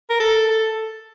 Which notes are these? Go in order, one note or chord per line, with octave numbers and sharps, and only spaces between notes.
A#4
A4
A4